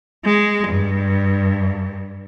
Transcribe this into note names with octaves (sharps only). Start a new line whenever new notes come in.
G#3
G2